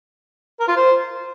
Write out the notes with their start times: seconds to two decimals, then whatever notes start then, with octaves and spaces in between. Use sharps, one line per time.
0.60 A#4
0.68 F4
0.76 C5